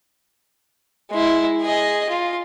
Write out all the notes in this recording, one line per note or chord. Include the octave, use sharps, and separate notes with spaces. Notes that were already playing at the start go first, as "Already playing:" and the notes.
G#3 E4
G#4 D#5
F4